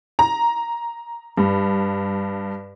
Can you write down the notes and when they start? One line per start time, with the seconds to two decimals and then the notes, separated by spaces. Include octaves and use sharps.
0.19 A#5
1.37 G2